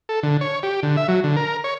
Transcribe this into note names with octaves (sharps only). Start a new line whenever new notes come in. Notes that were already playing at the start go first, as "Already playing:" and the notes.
A4
D3
C#5
G4
D3
E5
F#3
D3
A#4
C#5